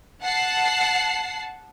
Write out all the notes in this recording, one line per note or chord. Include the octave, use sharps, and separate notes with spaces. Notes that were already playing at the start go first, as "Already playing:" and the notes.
F#5 A5 C7